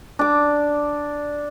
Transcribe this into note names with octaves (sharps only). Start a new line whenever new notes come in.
D4 D6